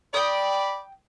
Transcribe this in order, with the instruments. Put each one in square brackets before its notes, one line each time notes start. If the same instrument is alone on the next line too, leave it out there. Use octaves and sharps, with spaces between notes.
[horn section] D5 B5 [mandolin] G5 D#6